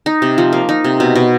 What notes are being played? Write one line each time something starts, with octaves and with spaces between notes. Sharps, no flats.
D#4
C3
F3
A#3
D#4
C3
B2
B2